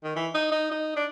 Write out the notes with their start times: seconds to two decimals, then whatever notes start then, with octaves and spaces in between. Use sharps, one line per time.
0.04 D#3
0.16 E3
0.34 D#4
0.52 D#4
0.71 D#4
0.96 D4